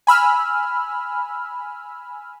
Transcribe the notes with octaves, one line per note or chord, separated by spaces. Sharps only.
G#5 B5 E6 F6